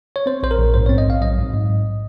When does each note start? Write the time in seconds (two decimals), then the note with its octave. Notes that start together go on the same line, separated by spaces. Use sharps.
0.16 C#5
0.26 C4 C5
0.43 A#1 C5
0.51 A#4
0.58 A#1
0.74 G#2 C5
0.86 C4 C#5
0.98 D#5
1.06 A#1 F5
1.21 F#3 D#5
1.38 G#2
1.53 G#2
1.70 G#2